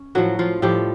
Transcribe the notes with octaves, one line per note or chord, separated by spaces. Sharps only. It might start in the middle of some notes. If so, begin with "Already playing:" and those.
Already playing: C#4
A2 F3 F#3 F#4
F3 F4
A2 F3 G3 G4